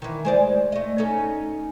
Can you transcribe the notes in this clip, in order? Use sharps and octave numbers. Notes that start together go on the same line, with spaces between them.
D#3 E3
G#3 C5 D5
A3 D#5
C#4 D#4 A4